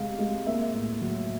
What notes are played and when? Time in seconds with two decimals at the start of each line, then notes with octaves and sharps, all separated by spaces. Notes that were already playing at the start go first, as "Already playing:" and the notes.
Already playing: C3 G#3 F5
0.19 G#3
0.46 A#3 E5
0.73 A2
1.02 F#3